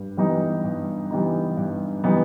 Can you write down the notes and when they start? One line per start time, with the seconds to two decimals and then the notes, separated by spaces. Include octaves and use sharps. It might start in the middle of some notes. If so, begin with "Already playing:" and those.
Already playing: G2
0.17 E3 G3 B3 D#4
0.64 G2
1.11 E3 G3 B3 D#4
1.57 G2
2.04 E3 G3 B3 D#4